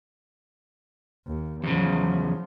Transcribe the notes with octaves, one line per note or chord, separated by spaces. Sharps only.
D#2
E2 C#3 F3 F#3